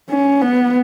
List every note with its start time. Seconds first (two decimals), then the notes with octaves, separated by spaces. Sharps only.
0.10 C#4
0.41 B3